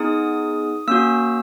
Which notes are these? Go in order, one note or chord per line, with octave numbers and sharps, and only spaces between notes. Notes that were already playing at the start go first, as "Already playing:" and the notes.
Already playing: B3 D#4 G#4 D#6
A#3 C#4 F#4 E6